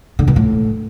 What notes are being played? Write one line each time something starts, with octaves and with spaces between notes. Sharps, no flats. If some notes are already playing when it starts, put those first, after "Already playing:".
D3
B2
A2